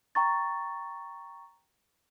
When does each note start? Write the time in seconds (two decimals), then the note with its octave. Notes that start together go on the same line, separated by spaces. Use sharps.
0.15 G5 A#5 C#6 A6